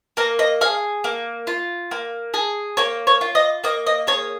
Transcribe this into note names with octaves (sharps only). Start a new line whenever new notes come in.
A#3 A#4
D#5
G#4 F5
A#3
F4
A#3
G#4
A#3 C#5
C#5
F4
D#5
A#3 D#5
D#5
G#4 C#5